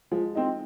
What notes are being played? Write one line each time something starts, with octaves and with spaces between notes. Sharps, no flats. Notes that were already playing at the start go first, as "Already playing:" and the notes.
F3 G#3
C4 D#4